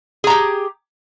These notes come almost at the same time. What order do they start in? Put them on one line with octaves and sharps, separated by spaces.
G#4 A#5 G4